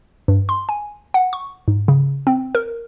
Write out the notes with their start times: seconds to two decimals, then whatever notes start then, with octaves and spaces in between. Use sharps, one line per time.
0.28 G2
0.49 C6
0.69 G#5
1.14 F#5
1.33 C#6
1.68 G#2
1.88 C#3
2.27 C4
2.55 A#4